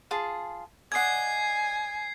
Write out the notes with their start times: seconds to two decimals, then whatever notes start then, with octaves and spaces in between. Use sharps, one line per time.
0.11 F4 G#4 A5
0.92 D5 D#5 F#5 G#5 G#6 C7